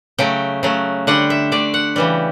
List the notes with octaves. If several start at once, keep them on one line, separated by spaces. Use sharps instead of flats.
C#3 F#3 A3 G5
C#3 F#3 A3
D3 G3 F#5
E5
D3 A3 D5
F#5
C#3 E3 G3